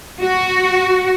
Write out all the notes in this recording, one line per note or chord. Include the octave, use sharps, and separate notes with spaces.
F#4